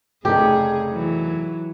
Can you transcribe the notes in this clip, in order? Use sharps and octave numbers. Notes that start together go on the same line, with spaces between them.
F1 C#3 D#4 G4 G#4
E3 F#3